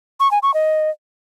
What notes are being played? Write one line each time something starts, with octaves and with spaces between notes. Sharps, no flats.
C#6
G#5
C#6
D#5